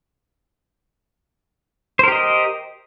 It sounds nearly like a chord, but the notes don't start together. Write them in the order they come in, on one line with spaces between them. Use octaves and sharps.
C5 A#4 G4 D#5